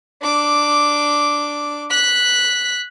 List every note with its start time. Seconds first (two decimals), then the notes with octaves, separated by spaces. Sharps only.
0.22 D4 D6
1.90 F#6 B6